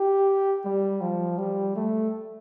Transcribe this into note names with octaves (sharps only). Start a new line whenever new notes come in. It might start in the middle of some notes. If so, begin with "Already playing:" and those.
Already playing: G4
G3
F3
G3
A3